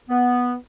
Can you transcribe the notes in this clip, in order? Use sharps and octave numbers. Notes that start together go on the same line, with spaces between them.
B3